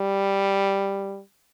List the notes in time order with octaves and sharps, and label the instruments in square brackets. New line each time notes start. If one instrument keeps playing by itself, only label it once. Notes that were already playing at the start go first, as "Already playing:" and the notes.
Already playing: [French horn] G3